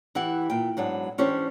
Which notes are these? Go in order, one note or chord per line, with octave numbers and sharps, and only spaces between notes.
E3 E4 G4 F#5
A#2 G5
G#2 F#3 B3 D4
E3 C#4 D4 G4 C5 C#5